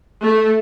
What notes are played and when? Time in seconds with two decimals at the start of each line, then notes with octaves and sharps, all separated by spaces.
0.22 A3